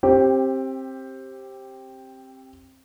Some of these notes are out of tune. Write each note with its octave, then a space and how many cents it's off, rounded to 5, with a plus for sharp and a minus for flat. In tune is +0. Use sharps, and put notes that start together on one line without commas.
C4 +20 G4 +0